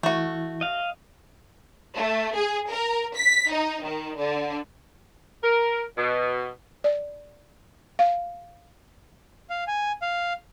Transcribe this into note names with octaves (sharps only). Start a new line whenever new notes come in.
E3 A3 E4 F#4
D#5 F5
A3
G#4
A#4
B6
D#4
D#3
D3
A#4
B2
D5
F5
F5
G#5
F5